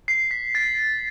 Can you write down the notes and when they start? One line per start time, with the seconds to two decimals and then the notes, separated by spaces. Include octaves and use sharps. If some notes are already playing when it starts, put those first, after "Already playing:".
0.08 C7
0.31 B6
0.55 A6